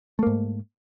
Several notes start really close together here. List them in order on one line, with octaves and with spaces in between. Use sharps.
A3 A#3 G#2